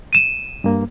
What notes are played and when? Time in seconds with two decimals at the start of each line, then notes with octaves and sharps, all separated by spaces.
0.13 D#7 E7
0.64 G2 A#3